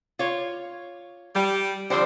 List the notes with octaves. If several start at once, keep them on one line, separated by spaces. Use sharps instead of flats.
F4 C#5
G3
D3 F3 G3 C4 C5